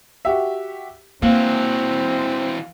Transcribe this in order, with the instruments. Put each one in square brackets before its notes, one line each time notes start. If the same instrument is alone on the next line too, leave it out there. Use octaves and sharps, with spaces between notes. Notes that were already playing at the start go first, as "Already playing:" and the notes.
[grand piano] F#4 G4 E5
[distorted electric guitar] E3 F#4 [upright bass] A#3 [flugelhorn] C4 [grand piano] F5